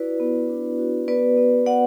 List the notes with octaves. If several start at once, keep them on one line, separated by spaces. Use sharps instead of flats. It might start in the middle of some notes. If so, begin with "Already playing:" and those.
Already playing: E4 F#4 B4 D5
B3
D4
F#4
B3 B4 D5
B3
B3 D5 F#5